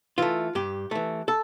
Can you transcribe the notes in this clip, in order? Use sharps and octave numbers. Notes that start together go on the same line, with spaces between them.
E3 A3 F4
G2 G4
E3 A3
A4